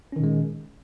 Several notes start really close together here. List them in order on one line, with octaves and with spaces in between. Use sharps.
C#4 D#3 A#2 G#3